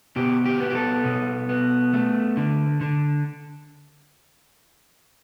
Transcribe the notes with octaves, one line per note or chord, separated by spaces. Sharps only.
B2 G4
G4
B3
G4
A4
B2
B3
A3
D3
D3